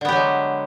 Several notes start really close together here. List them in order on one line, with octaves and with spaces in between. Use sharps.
D3 B3 G4 F#3 G#3